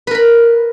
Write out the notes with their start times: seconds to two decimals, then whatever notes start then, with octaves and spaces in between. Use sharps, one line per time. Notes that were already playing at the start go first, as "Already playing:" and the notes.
0.07 B4
0.11 A#4
0.15 B5